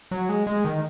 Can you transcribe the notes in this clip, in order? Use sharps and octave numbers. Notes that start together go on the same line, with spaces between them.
F#3
G#3
G#3
D#3